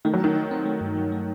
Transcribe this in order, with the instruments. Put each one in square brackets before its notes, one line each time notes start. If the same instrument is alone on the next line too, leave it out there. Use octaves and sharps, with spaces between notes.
[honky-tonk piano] D#3 [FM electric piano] A3
[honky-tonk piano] F#3
[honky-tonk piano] D#3 [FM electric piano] D#4
[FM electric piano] D#4
C4
A3
G2
F#3
A3